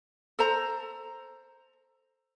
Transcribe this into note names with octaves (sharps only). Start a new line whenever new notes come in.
A4 C5 A#5